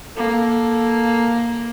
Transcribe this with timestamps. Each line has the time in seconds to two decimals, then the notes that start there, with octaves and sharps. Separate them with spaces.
0.17 A#3 A4